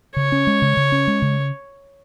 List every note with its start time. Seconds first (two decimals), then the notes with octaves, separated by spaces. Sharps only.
0.16 C#3 C#5
0.32 C#4
0.47 G#3
0.62 C#3
0.77 C#3
0.92 C#4
1.07 G#3
1.22 C#3